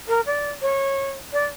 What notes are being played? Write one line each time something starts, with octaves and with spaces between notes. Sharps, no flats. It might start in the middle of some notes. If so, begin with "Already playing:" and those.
A#4
D5
C#5
D5